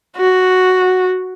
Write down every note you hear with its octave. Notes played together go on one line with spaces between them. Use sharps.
F#4